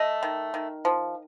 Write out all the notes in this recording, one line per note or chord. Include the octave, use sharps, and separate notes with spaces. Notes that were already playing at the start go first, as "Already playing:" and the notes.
Already playing: A3 D#5
D#3
D#3
F3